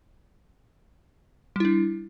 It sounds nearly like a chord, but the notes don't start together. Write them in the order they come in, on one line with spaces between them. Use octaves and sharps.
G3 E4 D4